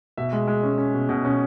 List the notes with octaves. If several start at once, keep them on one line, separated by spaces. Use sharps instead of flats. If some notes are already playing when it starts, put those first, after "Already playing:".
B2 E5
G#3
G#3
C#4
C#4
B2
B2
C#4